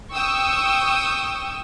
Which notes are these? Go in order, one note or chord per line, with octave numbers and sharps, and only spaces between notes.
G5 C#6 D#6 E6